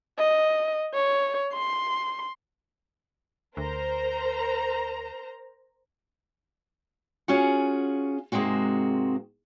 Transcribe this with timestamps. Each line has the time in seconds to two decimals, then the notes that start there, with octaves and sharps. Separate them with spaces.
0.18 D#5
0.94 C#5
1.53 C6
3.57 D2 A#4 C5 A#5
7.28 C#4 F4 F#4 G#4 F#5
8.32 G#2 C3 G#3 A#3 C4 F#4